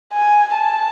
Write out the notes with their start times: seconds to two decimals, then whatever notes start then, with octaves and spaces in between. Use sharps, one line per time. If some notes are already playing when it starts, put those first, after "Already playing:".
0.14 G#5
0.54 A5